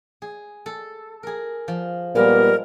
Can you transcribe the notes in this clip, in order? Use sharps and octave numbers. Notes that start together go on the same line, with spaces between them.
G#4
A4
G#4 A#4
F3
A#2 G3 G#3 B3 A#4